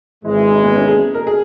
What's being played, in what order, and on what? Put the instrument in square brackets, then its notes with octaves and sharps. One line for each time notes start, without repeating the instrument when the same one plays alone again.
[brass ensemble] G#1 G#2 E3 G#3 [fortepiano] E4
[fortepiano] E4
D#4
B3
C#4
G#4
A#4
G#4